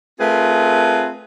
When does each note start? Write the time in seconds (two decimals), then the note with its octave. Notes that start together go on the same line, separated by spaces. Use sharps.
0.20 A3 C4 F4 G#4 A#4 B4